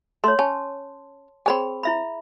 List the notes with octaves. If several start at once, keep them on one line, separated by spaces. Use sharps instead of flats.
A3 C#5 C6
C#4 A5
C4 G#4 C#5 G#5 B5
E4 E5 B5